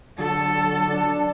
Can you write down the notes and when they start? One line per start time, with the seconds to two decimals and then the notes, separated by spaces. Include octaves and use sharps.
0.18 D3 F#3 A4 A5
0.88 D4